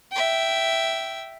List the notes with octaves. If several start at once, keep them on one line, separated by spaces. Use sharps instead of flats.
E5 G5